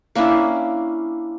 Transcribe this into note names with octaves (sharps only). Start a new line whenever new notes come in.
A#3 C#4 D4 E4